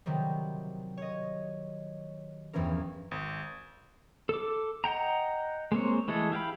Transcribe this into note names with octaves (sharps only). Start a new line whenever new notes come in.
C3 D#3 F#3 G3
C#5 D#5
E2 G2 E3 F3 C#4 A#4
G#1
A4 D6
D#5 F#5 G5 A#5
G#3 A#3 C4 C#5
E3 G#3 A3 G#4 A4
E4 G4 F5 G5 B5